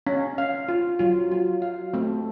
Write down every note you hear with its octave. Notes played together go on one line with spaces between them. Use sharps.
C#4
F5
F4
F#3 F4
F4
F5
A3 C4